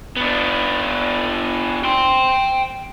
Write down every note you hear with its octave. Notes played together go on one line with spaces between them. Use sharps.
B3 D4
G5 C6